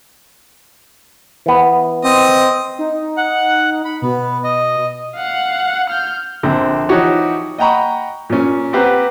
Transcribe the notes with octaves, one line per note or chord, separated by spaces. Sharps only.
E3 B3
C4 D#5
D#4
F#5
B5
B2 B3
D#5
F5 F#5
F6 G6
A#1 D3 C4
E3 F3 D#4 F#4 G4 C#5
D#5 F#5 G5 A#5 B5 C#6
A#2 C#4
C4 G4 B4 C5 F#5 A#5